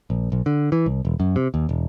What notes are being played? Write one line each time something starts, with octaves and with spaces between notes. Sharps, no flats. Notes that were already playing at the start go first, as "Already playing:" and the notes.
A#1
B1
D3
E3
C2
E1
F#2
C3
D#2
E1